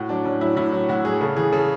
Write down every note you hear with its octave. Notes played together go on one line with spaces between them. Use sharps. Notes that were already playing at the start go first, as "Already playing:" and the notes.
Already playing: A2 F#4
F#3 D4
A2 C#4
F#3 E4
A2 E4
F#3
A2 F#4
F#3 G#4
C#3 A4
E3 G#4
C#3 A4